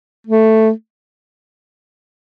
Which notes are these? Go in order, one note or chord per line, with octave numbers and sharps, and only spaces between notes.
A3